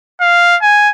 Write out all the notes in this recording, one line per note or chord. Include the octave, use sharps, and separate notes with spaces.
F5
G#5